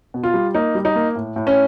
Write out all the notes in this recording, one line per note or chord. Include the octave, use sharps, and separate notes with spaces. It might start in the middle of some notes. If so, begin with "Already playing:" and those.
B2
F4
G3
A#3 D#4
G3
D#4
A#3
A2
A2
C#4